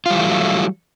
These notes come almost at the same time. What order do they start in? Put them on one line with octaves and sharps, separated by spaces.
F4 G3 E3 A3 F#3